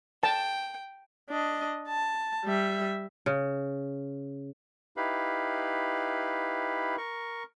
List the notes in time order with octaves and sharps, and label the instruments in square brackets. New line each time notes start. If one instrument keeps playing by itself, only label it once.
[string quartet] G5 [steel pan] A5
[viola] D4 D#5
A5
G3 E5
[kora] C#3
[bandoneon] D#4 E4 G4 B4 F5 B5
A#4 C#6